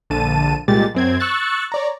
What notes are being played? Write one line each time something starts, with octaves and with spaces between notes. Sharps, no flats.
A#1 D3 A5 D#7
C2 A#2 G#3 G4 A6
F#2 C4 G#6
C#6 E6 F#6 A6
C#5 D5 A#5